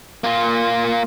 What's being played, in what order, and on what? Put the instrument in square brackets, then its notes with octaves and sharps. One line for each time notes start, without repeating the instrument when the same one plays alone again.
[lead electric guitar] A#3 F4